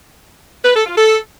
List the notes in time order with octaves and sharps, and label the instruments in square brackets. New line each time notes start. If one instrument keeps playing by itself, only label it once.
[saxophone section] B4
A4
F4
A4